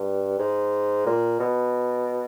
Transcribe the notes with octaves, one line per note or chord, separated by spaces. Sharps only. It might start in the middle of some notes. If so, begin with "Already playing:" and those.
Already playing: G2
G#2
A#2
B2